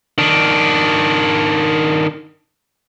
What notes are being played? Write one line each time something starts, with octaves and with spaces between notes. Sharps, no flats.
D#3 D4